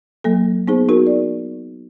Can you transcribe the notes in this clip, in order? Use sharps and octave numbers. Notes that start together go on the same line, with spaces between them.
F#3 A#3 A4
B3 D#4 G#4 C5
D#4 F#4 A#4
D5